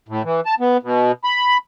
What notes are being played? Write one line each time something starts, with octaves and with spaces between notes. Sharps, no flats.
A2
E3
A5
B3
B2
B5